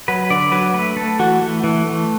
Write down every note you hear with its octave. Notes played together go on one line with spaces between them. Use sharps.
F#3 B4
D3 D5
F#3 B4
A3 B4
A3 A4
E3 F#4
A3
E3
A3